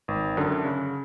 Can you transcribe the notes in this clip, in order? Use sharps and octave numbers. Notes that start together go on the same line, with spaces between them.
G#1
F#2 D3
C#3